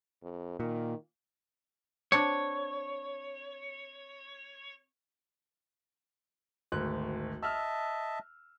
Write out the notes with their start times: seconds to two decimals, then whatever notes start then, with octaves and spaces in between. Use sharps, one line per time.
0.23 F2
0.60 A#2 D#3
2.12 C4 D4 C#5
6.72 G#1 D2 F#6
7.43 D#5 E5 A5 E6 F6